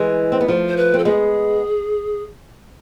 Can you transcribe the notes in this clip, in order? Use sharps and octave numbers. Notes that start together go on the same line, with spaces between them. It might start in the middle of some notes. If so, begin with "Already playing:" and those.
Already playing: E3 G#3
C4
B3
F3 A3
C5
B4
C4 A4
G#3 B3 G#4